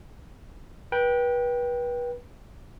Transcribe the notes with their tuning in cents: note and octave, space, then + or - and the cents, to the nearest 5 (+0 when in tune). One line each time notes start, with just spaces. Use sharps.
B4 -30 G5 +0